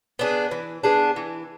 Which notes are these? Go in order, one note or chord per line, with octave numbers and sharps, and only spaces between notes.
B3 D4 G#4
E3
B3 D4 G#4
E3